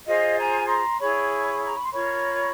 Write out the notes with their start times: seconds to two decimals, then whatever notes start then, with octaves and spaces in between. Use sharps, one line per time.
0.07 F4 G#4 C5 D#5 F5
0.37 G#5 A#5
0.68 A#5 C6
0.99 E4 G#4 C#5 B5 C#6
1.65 A#5
1.75 B5
1.83 C6
1.92 F4 A#4 C#5 B5 C#6